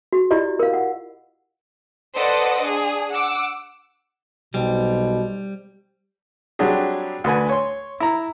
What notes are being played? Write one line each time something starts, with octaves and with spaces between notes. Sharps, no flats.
F#4
E4 F4 G4 D5 D#5
A#4 F5
F#5
A4 B4 C5 D5 D#5 F#5
D4 G#4
F#5 D6 E6
B1 B2 G3 C4
F#3 G3 C4 D4 G4 G#4
D2 D3 B4 G#5
C#5 C6
E4 A#5